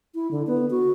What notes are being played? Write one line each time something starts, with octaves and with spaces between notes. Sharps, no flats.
E4
D3
B3
F#4